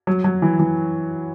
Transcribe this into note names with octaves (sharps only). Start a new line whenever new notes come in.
F#3
F#3
E3
E3